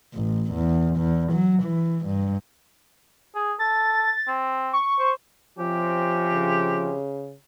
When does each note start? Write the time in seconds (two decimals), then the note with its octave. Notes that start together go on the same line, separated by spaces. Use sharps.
0.15 A1
0.54 E2
0.96 E2
1.32 F#3
1.63 E3
2.06 G2
3.35 G#4
3.59 A4 A6
4.27 C4
4.73 C#6
4.99 C5
5.59 C3 F3 C4 C#4 G4
6.33 C#3